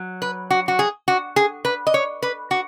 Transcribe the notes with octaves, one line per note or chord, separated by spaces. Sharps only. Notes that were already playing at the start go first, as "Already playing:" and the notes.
Already playing: F#3
B4
F#4
F#4
G#4
F#4
G#4
B4
D#5
C#5
B4
F#4